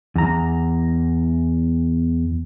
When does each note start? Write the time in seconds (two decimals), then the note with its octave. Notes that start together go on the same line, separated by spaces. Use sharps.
0.16 E2 A#5